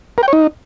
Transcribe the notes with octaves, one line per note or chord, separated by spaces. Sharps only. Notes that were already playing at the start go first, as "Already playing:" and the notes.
A#4
G5
C#5
D#4